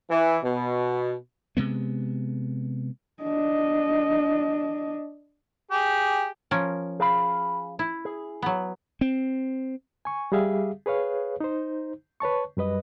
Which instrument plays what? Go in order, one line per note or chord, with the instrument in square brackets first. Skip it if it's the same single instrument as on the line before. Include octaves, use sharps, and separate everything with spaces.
[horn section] E3
B2
[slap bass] C3 G#3 B3
[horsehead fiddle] D4 D#5
[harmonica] G4 G#4
[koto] F3 C#4 A#4
[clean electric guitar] G#4 F5 B5
[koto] E4
[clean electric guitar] G#4
[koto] F#3 B3
[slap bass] C4
[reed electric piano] G#5 C#6
G3 G4 G#4 E5 F5
G#4 B4 C#5 F5
D#4 C5
B4 C#5 A5 C#6
F#2 G3 B4 D#5